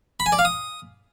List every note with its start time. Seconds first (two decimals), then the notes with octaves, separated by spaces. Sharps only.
0.20 B5
0.26 G#5
0.32 D5
0.39 F5
0.45 D#6